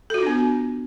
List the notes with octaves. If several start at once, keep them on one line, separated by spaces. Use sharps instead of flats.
B3 D4 F4 F#4 A4